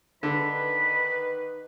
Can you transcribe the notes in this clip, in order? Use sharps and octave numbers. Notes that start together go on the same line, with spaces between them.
D3 D#3 D#4 B4 B5